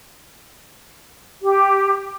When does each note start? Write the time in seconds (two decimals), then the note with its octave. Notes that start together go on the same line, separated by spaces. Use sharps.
1.41 G4